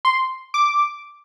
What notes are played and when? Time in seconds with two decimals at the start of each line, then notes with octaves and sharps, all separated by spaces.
0.05 C6
0.54 D6